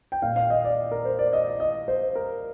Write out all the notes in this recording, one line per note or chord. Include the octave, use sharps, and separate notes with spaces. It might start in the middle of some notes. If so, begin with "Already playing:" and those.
G5
A#2 F5
F5
D#5
D5
A#4
C5
D5
D#5
D#5
C5
A#4